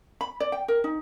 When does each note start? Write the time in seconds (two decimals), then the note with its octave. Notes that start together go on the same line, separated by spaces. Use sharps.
0.21 B5
0.40 D5
0.52 G5
0.68 A#4
0.84 D#4